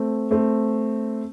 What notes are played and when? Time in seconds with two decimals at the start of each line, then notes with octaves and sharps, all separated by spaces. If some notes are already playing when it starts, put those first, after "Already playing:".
Already playing: A3 C4
0.31 A3 C4